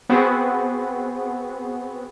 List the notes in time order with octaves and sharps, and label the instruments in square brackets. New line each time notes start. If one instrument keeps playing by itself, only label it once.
[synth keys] B3 C4 F#4 G#4